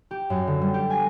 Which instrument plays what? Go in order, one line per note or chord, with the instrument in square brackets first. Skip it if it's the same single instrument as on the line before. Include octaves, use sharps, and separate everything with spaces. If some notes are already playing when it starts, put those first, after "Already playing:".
[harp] G4
F#2
D3
G3
G4
G#5